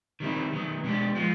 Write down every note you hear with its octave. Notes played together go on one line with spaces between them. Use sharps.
D#3 G3 C4 E4
D#3 F#3 B3
B2 G#3 B3 D4 G4
F3 G#3 B3